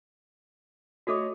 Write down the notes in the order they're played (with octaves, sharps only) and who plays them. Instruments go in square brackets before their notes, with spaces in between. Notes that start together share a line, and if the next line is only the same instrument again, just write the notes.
[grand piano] A3 C#5 D#5 [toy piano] F#4 A4 D6